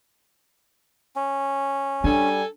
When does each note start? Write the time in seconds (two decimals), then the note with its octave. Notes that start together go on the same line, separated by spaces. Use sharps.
1.16 C#4
2.04 G3 D4 A4 G#5